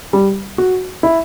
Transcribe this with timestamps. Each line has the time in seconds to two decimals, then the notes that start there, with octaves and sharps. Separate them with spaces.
0.13 G3
0.58 F#4
1.03 E4